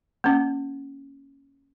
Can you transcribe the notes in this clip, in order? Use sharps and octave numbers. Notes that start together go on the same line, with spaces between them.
A#3 C#4